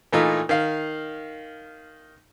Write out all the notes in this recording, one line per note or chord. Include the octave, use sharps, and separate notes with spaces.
A#2 E3 A3 D#4 F4
D#3 F5